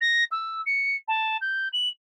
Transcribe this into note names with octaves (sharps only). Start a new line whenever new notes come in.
A#6
E6
C#7
A5
G6
F#7